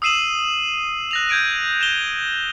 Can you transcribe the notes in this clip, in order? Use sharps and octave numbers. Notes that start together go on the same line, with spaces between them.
D#6 E6 C7 D#7 E7 F#7
F#6 A#6 F7
G6 G#6 D7 D#7
E7 F7 G7